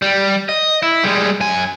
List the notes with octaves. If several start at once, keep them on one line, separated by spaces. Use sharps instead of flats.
G3
D#5
E4
G3 G#3
F#2 G#5